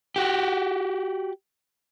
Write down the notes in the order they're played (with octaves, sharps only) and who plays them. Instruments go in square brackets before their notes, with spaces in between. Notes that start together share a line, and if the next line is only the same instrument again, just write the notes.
[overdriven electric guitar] F#4 G4